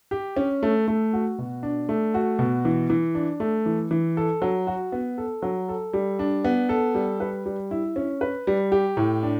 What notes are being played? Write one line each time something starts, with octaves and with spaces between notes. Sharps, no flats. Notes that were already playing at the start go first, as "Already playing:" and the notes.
G4
C#4
A3
A3
F#4
B2
D4
A3
F#4
B2
E3
E3
D4
A3
E3
E3
A4
F#3
F#4
B3
A4
F#3
A4
G3
D4
B3
A4
G3
B4
G3
E4
C#4
B4
G3
G4
A2
D4